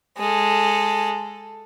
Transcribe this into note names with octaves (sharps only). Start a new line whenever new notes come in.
G#3 A4